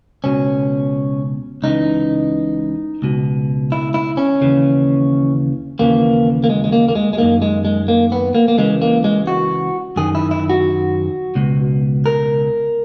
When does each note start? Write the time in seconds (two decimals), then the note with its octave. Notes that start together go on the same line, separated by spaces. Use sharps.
0.24 C#2 B2 C#4
1.63 C#2 C#3 E3 D#4
3.02 C#2 B2
3.72 E4
3.94 E4
4.17 C#4
4.41 D#2 C#3 E3
5.79 D#2 C#3 E3 A#3
6.44 A#3
6.49 G#3
6.64 G#3
6.72 A#3
6.89 A#3
6.95 G#3
7.13 G#3
7.18 F#2 D#3 A#3
7.42 G#3
7.65 G#3
7.88 A#3
8.12 B3
8.35 A#3
8.48 A#3
8.57 C#2 C#3 E3 G#3
8.82 A#3
9.04 G#3
9.27 F#4
9.96 F#2 D#3 G#4
10.15 E4
10.31 E4
10.50 F#4
11.35 C#2 B2
12.06 A#4